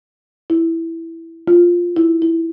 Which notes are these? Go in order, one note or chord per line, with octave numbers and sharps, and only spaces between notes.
E4
F4
E4
E4